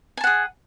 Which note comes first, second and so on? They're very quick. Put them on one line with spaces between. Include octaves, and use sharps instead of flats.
G#5 A5 F#5 G#4